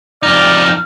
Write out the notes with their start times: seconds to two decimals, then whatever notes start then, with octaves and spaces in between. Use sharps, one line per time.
0.23 F2 D#4 D5 F6